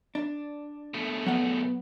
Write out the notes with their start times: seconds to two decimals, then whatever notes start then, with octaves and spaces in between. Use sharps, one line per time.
0.15 D4
0.94 B2 A3
1.26 F#3 B3 F#5